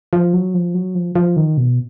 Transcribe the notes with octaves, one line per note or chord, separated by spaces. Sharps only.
F3
F#3
F3
F#3
F3
F3
D#3
B2